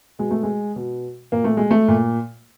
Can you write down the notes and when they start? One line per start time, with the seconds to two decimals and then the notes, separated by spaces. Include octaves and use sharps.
0.19 B2 G#3
0.31 A3
0.43 G#3
0.76 B2
1.32 A#2 A#3
1.44 A3
1.57 G#3
1.71 A3
1.88 A#2